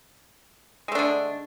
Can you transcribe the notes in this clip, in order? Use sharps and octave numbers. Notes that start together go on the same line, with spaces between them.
D3 G#3 A3 D4